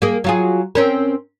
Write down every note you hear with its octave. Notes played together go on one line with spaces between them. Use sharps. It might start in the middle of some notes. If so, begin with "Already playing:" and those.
A#3 G#4
F#3 F4 G#4
C4 C#4 A#4